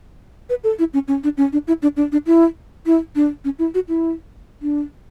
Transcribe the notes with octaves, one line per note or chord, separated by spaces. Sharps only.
B4
A4
E4
C#4
C#4
D4
C#4
D4
E4
D4
D4
D4
E4
E4
D4
C#4
E4
F#4
E4
D4